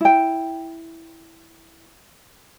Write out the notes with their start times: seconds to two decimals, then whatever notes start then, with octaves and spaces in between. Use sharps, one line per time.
0.01 E4 G5